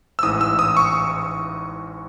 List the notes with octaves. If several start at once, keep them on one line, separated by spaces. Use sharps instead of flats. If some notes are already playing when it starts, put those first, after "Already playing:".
E6
A1 G#2 E3 D#6
E6
D#6
C#6